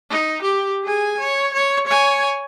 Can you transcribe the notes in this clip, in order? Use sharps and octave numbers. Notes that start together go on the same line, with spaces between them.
D#4
G4
G#4 G#5
C#5
C#5
C#5 G#5